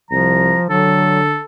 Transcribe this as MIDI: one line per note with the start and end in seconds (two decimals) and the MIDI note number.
0.11 0.54 36
0.11 0.68 53
0.11 0.63 82
0.70 1.39 50
0.70 1.20 54
0.70 1.44 69